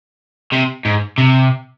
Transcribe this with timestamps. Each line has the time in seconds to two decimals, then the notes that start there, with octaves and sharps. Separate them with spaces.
0.52 C3
0.85 G#2
1.18 C3